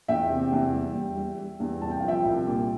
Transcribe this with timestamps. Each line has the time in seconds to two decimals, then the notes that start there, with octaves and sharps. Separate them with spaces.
0.08 E2 E5 G5
0.30 C3
0.52 E2
0.74 G3
0.95 E2
1.16 G3
1.39 G3
1.60 E2
1.82 C2 A5
1.91 G5
2.00 F5
2.04 F3 E5 G5
2.25 C2
2.47 A#2